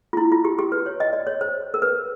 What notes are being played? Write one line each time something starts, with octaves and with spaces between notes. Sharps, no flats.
F4
E4
F4
G4
G4
B4
C#5
D#5
D5
C#5
C5
A#4
B4